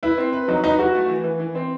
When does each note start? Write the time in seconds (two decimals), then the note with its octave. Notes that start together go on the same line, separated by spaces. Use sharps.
0.03 E4 B4
0.18 C4
0.33 B4
0.48 F#3 D#4
0.64 D#4 B4
0.79 E4 F#4
0.95 A3
1.09 E3
1.24 E3
1.40 E3
1.55 C4